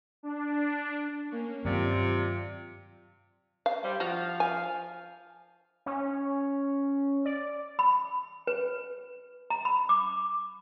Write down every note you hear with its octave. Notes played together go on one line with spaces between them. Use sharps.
D4
A#3 C#4
G2 C3 D#3 F#3 F4 D5
F5
G3 C5
F3 F#4 F5
G#5
C#4
D5
B5
B4
A#5
B5
D6